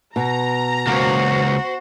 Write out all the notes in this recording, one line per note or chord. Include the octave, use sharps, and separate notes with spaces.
B2 A#5
C#2 A#3 F#4 C5